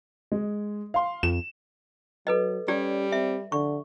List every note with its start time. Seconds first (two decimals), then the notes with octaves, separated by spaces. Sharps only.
0.32 G#3
0.94 F5 C6
1.23 F2 E7
2.27 F#3 A4 B4 D#5
2.68 G3 C#4 G4 D5
3.12 C4 E5
3.52 D3 C#6